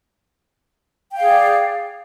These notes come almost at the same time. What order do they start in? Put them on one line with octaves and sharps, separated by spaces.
G5 F5 G#4 D5